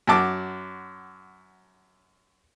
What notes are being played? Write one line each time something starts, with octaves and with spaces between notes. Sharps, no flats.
F#2 F#4 A5 D6